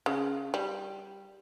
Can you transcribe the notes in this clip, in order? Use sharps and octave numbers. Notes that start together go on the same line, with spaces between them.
C#3
G3